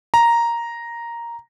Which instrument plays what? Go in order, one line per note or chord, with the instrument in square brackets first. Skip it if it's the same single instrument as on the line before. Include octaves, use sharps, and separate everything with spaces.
[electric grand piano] A#5